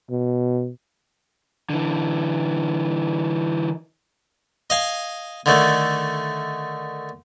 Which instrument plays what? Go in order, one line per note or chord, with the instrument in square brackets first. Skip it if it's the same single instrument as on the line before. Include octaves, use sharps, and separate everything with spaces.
[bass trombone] B2
[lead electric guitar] D3 E3
[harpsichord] D#5 F5 G#5
D3 D#3 A3